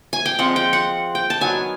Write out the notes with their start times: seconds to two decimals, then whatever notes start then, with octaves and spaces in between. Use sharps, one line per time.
0.13 G#5
0.26 G5
0.39 F3 G#3 C4 F4 F#5
0.56 G5
0.73 F#5
1.15 G5
1.30 A5
1.41 D#3 F#3 B3 G#5